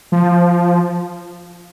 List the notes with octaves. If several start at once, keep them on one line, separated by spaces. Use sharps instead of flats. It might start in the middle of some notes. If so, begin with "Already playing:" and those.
F3